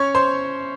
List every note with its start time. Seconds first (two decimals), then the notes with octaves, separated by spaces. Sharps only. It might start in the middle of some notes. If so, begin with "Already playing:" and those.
Already playing: C#4 C#5 C#6
0.15 C5 C6